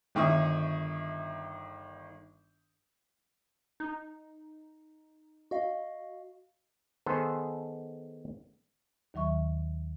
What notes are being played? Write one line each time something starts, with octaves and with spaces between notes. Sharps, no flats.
G1 D#3 E5 C#6 D#6
D#4
F#4 D#5 F5
D#3 B3 G#4 A4 C5
D#2 D#3 F#3 E5 C#6